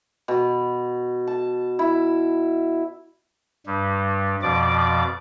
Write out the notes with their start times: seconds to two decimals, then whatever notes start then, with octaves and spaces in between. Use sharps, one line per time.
0.28 B2
1.27 A5
1.79 E4
3.66 G2 G3
4.43 F2 B2 F3 D5 D6